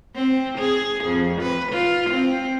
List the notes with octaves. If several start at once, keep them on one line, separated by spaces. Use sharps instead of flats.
C4
G#4
F2
B4
F4
C4